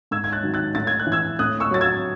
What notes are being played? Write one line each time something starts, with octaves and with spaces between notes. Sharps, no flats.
G#2 E6 G#6
G#6
F#6 A6
D#3 F#3
F#6 A6
A2 A6
G#6
F#6
E3
E6 G#6
A2 D#6 F#6
C#6 E6
F#3 A6
E6 G#6